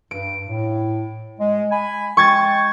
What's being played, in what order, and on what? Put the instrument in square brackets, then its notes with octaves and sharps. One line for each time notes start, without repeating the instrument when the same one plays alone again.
[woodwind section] G2 [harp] D7
[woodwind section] A2
G#3
G#5 B5
[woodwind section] G#3 G5 [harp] C#6 G#6 A6